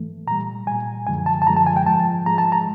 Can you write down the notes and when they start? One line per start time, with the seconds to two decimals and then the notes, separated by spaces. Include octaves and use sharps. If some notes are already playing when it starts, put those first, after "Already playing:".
Already playing: G#2 E3 A3
0.27 A#2 G3 A#5
0.67 A#2 G3 G#5
1.07 F#2 D3 F3 G#3 G#5
1.26 A5
1.42 A5
1.47 F#2 D3 F3 G#3 A#5
1.57 A5
1.66 G#5
1.76 G5
1.86 G#2 F3 G#3 A5
2.26 G#2 F3 G#3 A#5
2.38 A5
2.52 A#5